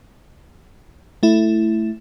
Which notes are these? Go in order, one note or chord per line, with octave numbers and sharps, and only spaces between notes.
A3 E4